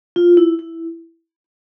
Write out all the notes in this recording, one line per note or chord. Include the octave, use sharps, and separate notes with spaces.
F4
E4
E4